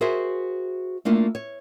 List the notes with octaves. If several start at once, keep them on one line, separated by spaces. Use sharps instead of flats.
F#4 G#4 A#4 C5 E5 G#5
A3 A#3 D4 E4 F4
C#5